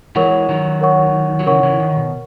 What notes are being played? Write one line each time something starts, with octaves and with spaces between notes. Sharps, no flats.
E3 G#3 A#4 C#5 F#5 C#6
D#3 F#3
A#4 C#5 F#5 C#6
F#3
C#3 E3 A#4 C#5 F#5 C#6
C#3 E3
D#3
B2